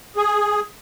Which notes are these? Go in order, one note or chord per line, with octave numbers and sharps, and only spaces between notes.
G#4